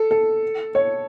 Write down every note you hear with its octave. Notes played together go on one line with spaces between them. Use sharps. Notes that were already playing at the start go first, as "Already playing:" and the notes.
Already playing: A4
A4
C#5